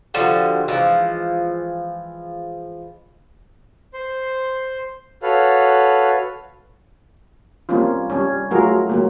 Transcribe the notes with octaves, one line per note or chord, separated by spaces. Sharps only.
D3 F3 G3 F#4
E3 F3 G#3
C5 C6
F#4 A4 B4 C#5 F5
G3 A#3 C4 C#4 F4
G3 C#4
F#3 A3 F4 F#4 G#4 A#4
F#3 G#3 A#3